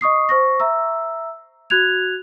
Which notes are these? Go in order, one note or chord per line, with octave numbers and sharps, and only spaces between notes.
D#5 C#6 D#6 C7
C5 C#6 A#6
E5 A#5 E6
F#4 F#6 G#6 F7